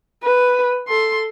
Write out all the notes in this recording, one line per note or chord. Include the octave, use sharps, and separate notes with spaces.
B4
A4 C6